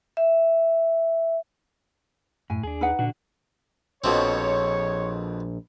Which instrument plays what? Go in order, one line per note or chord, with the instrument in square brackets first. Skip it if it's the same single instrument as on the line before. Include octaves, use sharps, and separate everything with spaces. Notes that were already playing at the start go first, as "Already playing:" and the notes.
[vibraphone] E5
[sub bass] F#2 [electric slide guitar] A2 [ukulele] G#5
[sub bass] D#2 [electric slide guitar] D4 G#4
[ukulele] D#4 B4 F#5
[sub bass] A#2 [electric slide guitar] D3 D4 F#4
[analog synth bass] A#1 [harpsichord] F2 B2 C4 [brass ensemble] C#5